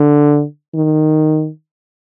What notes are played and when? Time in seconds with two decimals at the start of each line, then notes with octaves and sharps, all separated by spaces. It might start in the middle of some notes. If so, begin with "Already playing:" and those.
Already playing: D3
0.75 D#3